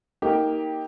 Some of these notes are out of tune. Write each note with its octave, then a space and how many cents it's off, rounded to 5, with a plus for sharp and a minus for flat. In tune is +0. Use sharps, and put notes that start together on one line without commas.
A#3 +0 D#4 +20 G4 +0